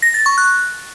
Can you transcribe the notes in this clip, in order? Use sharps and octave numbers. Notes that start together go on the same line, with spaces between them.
A#6
A6
C#6
F#6